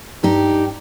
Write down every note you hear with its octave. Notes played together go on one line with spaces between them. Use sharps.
G2 D#4 G4